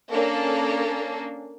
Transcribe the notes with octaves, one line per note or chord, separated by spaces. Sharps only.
A#3 C#4 D4 A4